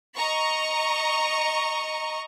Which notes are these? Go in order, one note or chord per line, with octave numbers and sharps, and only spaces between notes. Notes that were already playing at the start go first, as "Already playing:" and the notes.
D#5 A#5 C#6